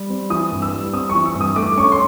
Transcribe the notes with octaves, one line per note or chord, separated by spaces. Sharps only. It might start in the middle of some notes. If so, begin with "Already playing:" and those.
Already playing: G3
C4
E3 D#6
G2
E6
G3
C4 D#6
E3 C#6
E6
G2
D#6
A3 D6
C#4 C#6
C6